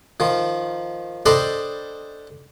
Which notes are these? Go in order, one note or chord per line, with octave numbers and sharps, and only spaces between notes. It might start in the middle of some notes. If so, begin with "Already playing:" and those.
D#3 F3
D4 A4 C5 D#5 G5 B5